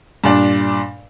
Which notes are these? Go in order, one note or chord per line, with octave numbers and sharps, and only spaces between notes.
G2 A#2 D4